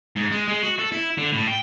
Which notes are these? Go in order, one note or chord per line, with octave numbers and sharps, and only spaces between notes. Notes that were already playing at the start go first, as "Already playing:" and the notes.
G#2
G#3
G#3
F#4
A4
E4
D3
A2
G5